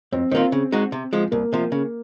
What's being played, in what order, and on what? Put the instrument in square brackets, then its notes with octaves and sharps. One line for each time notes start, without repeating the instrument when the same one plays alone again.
[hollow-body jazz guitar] F2 [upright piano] C4
[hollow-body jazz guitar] D#3 A#3 F4 [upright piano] C4
[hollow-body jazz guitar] C#3
G#3 D#4 F#4
C3
F3 G#3
[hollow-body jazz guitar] C2 [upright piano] A#3
[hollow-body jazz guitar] C3 F3
C#3